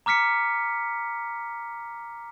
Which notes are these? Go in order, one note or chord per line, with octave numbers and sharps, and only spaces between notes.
A#5 D6 F6 B6 C#7